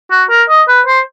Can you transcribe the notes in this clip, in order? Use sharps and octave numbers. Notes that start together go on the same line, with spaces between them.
F#4
A#4
D#5
B4
C5